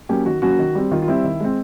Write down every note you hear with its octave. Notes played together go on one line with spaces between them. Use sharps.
F#3 A#3 C#4 G4
D#3 F#4
F#3 A#3 C#4 F#4
D#3
G3 C4
D#3 F4
F4
G3 C4 E4
D#3
G#3 C4